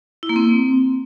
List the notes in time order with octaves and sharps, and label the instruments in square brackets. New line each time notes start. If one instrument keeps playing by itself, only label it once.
[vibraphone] E4
A#3
C4